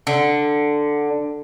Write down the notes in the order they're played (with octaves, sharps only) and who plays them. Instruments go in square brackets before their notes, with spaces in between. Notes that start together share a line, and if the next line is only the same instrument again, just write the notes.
[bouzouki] D3